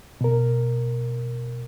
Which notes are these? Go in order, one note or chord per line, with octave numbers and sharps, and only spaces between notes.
B2 A#4